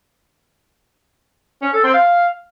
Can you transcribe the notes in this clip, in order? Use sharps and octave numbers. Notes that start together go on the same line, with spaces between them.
C#4
A4
C4
F5